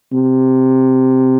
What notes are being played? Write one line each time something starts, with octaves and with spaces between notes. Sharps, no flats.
C3